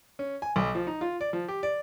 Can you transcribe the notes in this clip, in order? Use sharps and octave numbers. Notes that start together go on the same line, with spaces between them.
C#4
G#5
B1
F3
D#4
F4
D5
F3
G4
D5